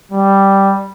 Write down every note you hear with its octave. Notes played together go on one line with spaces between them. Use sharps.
G3